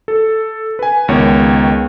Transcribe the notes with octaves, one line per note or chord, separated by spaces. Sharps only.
A4
B4 G#5
C#2 D#3 B3 C#5